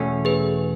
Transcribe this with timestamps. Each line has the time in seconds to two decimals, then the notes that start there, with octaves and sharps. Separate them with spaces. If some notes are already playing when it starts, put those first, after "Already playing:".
Already playing: E2 B2 A3 C#4
0.25 G#4 B4